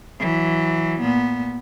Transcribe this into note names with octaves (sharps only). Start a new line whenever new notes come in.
E3 F#3
A#2 B3